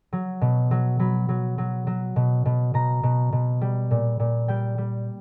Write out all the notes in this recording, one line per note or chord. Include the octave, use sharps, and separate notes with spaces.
F#3
B2
F#3
F#3 B5
F#3
F#3
F#3
B2
B2
B2 A#5
B2
B2
G3
A#2
A#2
G3 G5
G3